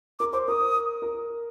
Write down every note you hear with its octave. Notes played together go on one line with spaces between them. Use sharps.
A#4 D6
C5 D6
A#4 D#6
A#4